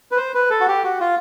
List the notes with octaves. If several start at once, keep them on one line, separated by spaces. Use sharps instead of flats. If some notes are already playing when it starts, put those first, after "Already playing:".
B4
C5
B4
A4
F#4
G4
F#4
F4